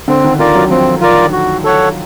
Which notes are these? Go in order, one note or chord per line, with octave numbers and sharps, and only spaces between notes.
D3 C4
D#3
D#3 F4 A#4 D5
F#3
F3 C4
F4 A#4 D5
F#4
A4 C#5 F#5